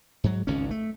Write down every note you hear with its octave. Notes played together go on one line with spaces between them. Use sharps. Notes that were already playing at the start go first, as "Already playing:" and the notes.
G#2 F#3
G#1 C#2 G#2 C#4
A3